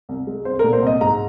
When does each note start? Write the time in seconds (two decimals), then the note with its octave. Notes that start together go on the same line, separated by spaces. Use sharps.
0.09 C2
0.27 G#3
0.45 C2 C5
0.59 A#2 A#4
0.73 C5
0.83 C2 D#5
1.01 G#2 A#5